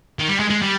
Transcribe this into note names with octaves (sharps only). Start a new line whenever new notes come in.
D#3
G3
G#3
G#3
G3